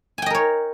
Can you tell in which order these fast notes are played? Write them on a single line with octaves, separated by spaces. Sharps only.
G#5 G5 D#5 A#4 C#5